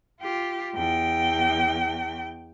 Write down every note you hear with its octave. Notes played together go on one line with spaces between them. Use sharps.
F4 G4
E2 G5